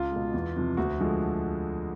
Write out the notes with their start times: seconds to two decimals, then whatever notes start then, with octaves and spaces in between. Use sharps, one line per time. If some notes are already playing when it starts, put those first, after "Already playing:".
Already playing: C#2 F4
0.12 B2 G#3
0.34 E2
0.56 C3 F3
0.77 D2 F#4
1.00 D3 F3 G#3